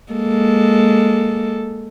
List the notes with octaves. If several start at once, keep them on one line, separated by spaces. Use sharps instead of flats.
G#3 A#3 A4